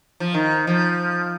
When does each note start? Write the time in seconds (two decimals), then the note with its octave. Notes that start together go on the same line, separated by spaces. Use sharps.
0.20 F3
0.34 D#3
0.67 F3